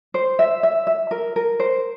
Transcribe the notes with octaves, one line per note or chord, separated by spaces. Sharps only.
C5
E5
E5
E5
A#4
A#4
C5